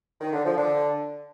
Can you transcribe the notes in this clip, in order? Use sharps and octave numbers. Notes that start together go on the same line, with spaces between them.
D#3
D3
F3
D3